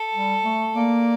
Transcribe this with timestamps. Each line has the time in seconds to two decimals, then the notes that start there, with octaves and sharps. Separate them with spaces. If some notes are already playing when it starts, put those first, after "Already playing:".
Already playing: A4
0.14 G3
0.44 A3
0.74 A#3 D5